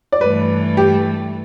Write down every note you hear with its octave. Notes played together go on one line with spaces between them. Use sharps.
D5
G2 E3 A3 B4
G4